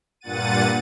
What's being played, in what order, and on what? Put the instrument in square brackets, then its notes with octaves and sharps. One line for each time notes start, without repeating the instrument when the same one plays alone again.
[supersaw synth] G2 A#2 F#5 A6 D#7